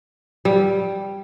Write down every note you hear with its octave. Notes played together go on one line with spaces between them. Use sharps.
G3